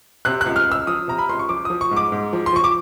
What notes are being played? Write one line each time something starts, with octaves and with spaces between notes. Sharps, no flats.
C3 F#6
F#6
C#2
F6
C#2 E6
F3 D#6
C3 A#5
B5
C#2 C6
C#6
F3 D6
F3 D#6
C#6
G#2
D6
G#2
F3
C6
F3 C#6
D6